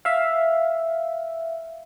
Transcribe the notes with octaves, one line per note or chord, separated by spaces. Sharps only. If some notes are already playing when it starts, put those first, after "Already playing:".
E5 F5